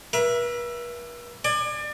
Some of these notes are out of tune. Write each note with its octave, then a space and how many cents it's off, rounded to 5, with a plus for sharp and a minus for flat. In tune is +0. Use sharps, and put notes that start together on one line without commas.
B4 -45 E5 +20
D5 +30 G#5 +0